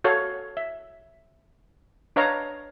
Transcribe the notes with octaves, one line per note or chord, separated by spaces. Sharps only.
F#4 A4 C#5 F5
E5
D4 B4 C#5 D#5 F5 A#5